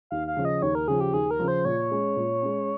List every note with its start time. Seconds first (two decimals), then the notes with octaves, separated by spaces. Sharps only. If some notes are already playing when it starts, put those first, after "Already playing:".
0.11 D#2 F5
0.28 F5
0.37 C#3 F3
0.45 D#5
0.62 D#2 C#5
0.75 A#4
0.88 C#3 F3 G#4
1.00 G4
1.13 D#2 G#4
1.31 A#4
1.39 C#3 F3
1.48 C5
1.65 A#2 C#5
1.91 G#3 C#4
2.16 A#2
2.42 G#3 C#4